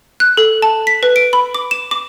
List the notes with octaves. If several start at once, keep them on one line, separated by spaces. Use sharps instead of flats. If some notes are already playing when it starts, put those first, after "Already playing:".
F#6
A4
A5
B6
B4
D7
B5
D6
E7
D6